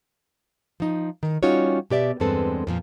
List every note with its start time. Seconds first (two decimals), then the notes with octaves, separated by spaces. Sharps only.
0.80 F3 D#4
1.23 D#3
1.43 G3 C#4 D#4 F4 F#4 C#5
1.90 B2 G4 D5 E5
2.20 E2 G2 G#3 C4 A4 B4
2.67 F2 A#2 F3